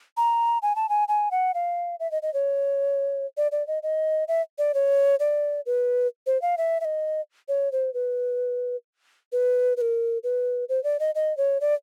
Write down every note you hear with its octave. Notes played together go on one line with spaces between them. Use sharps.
A#5
G#5
A5
G#5
G#5
F#5
F5
E5
D#5
D#5
C#5
D5
D5
D#5
D#5
E5
D5
C#5
D5
B4
C5
F5
E5
E5
D#5
C#5
C5
B4
B4
B4
A#4
B4
C5
D5
D#5
D#5
C#5
D5